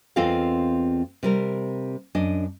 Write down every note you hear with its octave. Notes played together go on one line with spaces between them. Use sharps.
E2 C4 F4 A4 D#5 F5
C3 G3 A#4
F#2 D4 D#5